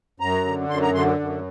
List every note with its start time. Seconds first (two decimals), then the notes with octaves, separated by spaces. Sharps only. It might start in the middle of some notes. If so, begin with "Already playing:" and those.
0.20 F#2 A#5
0.45 D3
0.69 F#2 C6
0.82 A#5
0.94 D3 C6
1.19 F#2